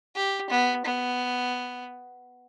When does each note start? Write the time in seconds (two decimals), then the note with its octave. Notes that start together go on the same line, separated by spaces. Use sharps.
0.16 G4
0.50 B3
0.85 B3